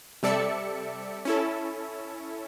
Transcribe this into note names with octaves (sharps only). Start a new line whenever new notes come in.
C3 G3 A4 D5 E5 C#7
C#4 E4 A4